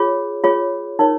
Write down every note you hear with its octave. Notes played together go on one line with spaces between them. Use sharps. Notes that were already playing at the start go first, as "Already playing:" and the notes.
Already playing: F4 G#4 C#5
F4 G#4 C#5
D#4 A#4 C#5